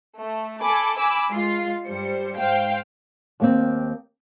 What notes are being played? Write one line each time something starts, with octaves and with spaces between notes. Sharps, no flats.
A3
A4 G#5 B5 D6
G#5 B5 D6 E6
G#3 F4 C7
G2 G3 C5 C#7
G#2 C5 F5 G5
D#2 A#3 C4